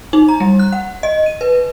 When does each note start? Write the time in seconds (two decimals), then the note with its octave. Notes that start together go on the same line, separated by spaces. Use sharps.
0.13 D#4
0.28 A#5
0.40 G3
0.59 F#6
0.72 F#5
1.03 D#5
1.26 D#7
1.41 B4